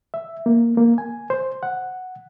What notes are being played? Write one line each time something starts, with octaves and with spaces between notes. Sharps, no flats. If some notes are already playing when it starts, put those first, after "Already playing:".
E5
A#3
A#3
G#5
C5
F#5